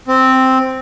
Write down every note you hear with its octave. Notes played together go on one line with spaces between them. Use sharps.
C4